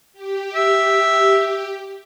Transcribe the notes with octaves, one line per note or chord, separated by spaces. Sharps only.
G4
E5